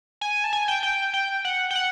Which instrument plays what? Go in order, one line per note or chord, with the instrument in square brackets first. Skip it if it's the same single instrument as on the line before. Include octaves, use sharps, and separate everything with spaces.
[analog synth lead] G#5
A5
G#5
G5
G5
G5
F#5
G5
F#5